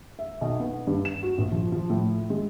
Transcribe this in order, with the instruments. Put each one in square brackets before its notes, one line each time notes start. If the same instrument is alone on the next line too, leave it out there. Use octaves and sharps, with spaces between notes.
[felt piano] E5
B1
B3
G2
E7
F#4
A#1
F3
F3
A2
G#3